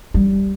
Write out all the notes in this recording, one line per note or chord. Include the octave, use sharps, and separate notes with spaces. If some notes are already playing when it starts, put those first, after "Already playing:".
G3